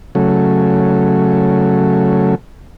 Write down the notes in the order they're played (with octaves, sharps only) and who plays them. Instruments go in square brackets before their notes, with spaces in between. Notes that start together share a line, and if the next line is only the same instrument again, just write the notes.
[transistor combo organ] C#3 F#3 A3